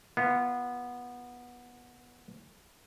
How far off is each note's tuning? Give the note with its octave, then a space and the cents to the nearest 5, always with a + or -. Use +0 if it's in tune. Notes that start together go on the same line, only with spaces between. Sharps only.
B3 -15 F4 -30